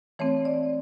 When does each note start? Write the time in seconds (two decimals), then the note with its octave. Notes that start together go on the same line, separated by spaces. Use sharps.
0.19 E3 A3 C4 C#5
0.45 D5